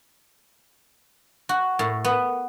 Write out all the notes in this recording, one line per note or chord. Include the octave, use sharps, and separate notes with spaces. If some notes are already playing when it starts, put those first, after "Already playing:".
F#4
A2
B3